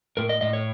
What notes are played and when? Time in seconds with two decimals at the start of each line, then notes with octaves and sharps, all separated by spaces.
0.17 A2 A#4
0.29 D#5
0.41 A2 D#5
0.53 C#5